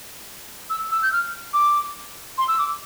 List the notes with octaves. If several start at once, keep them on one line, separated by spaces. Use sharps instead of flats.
E6
E6
G6
F6
D6
C6
E6
D6